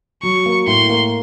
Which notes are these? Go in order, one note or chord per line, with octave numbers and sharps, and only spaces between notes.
F#3 C#6
A#3
A2 C6
A#3